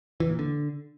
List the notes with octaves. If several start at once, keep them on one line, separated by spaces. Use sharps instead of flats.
E3
A#2
D3